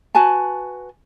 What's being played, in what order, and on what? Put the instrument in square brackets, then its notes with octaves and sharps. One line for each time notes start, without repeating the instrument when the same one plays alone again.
[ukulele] F#4 B4 G#5 A5